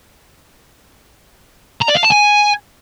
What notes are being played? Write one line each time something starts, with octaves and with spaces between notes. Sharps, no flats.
A#5
D5
F5
A5
G#5